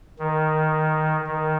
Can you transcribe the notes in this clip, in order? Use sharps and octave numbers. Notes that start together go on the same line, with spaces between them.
D#3
D#3